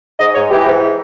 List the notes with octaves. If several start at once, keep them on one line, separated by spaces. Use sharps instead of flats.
G#2 D#5
G#2 C#5
E3 G4
G#2